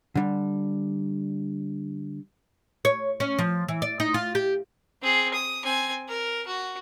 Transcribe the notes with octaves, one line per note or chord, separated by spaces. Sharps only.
D3 G3
C#5
C#4
F3
E3
D5
D#4
F4
G4
C4 G#4
D#6
C4 G#5
A#4
F#4